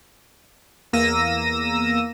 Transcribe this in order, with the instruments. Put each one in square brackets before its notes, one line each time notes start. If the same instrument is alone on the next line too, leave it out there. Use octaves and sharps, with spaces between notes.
[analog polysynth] E2 A#3 E6 A#6 D#7